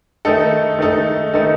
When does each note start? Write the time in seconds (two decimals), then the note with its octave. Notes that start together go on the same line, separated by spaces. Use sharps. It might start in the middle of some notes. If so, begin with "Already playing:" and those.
0.25 D#3 A3 D#4 A4
0.79 D#3 A3 D#4 A4
1.33 D#3 A3 D#4 A4